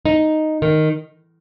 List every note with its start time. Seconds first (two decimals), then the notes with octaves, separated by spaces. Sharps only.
0.05 D#4
0.62 D#3